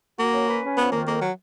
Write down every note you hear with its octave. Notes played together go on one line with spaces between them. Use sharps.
A#3 F#4
C#4
B4
C#4
F2 B3
D#3 A#3
F2 A#3
F#3